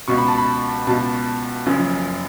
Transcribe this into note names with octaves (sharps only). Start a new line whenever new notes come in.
C#2 B2 C#6
B5
A5
B5
C#2 B2 A5
F#1 F#2 C#3 F3